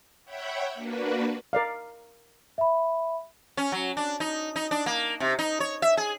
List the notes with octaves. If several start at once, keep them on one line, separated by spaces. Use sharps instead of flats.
C#5 E5 F#5 G5 B5
A#3 D4 F#4 B4
A#4 D5 F5
E5 B5
C#4
F#3
D4
D#4
D#4
D4
A#3
C3
D#4
C#5
E5
G#4